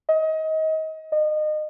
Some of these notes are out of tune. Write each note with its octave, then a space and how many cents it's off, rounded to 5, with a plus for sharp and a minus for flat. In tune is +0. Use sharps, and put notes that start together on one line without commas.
D#5 +25
D#5 -30